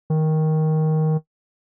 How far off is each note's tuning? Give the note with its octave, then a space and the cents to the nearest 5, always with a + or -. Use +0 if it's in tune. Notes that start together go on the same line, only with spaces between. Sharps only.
D#3 +10